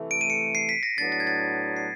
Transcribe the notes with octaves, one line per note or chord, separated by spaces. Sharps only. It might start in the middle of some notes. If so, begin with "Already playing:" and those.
Already playing: C3 E3 A3
D7
D#7
C#7
C7
B6
A#6
A2 F#3 B3 D4 A6
A6
G#6
A6
C7